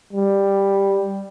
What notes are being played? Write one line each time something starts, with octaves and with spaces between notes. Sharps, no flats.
G3